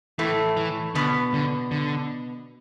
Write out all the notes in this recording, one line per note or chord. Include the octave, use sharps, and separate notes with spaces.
A2 E3 A3
E3
B2 D3 B3
D3
D3